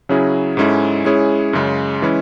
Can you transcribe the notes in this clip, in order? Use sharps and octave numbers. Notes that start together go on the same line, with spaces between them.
C#3 F#3 C#4 E4 G#4
G#2 G#3 C#4 E4 A4
G#3 C#4 E4 G#4 C#5
F#2 C#3 G#3
E3 G#3 C#4 E4